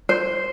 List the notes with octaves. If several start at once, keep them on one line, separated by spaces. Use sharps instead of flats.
C5